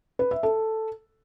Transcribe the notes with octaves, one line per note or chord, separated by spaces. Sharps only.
B4
E5
A4